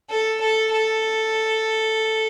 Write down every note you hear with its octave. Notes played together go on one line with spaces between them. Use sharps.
A4
A4
A4